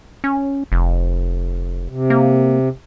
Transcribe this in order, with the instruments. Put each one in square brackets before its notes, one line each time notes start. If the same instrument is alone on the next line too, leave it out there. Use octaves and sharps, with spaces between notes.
[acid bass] C#4
F1
[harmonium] C3
[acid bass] A#3